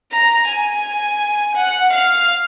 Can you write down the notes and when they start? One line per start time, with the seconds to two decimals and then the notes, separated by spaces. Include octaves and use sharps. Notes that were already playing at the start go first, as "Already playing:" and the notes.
0.12 A#5
0.48 G#5
1.56 F#5
1.93 F5